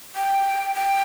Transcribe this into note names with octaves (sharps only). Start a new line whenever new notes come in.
G5
G5